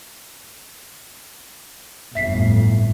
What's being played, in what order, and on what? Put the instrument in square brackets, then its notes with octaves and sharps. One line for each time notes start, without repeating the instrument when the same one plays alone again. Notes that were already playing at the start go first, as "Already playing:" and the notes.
[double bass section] G1 F2 A2 [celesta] E5 B6 C7